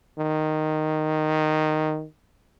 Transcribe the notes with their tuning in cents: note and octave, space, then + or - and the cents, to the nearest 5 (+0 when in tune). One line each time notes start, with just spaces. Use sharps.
D#3 -5